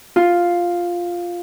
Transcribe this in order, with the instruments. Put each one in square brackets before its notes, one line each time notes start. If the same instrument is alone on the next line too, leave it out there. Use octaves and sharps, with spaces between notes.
[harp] F4